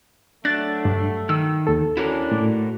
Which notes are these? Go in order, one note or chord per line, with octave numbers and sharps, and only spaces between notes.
F#3 A3 D4 F#6 A6
G2
D#3 E6
D#2 A4
C#4 D4 E4 F#4 A#4
A2